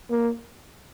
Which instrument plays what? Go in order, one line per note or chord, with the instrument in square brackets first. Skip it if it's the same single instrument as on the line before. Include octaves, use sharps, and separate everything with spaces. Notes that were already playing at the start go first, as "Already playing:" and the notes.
[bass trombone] A#3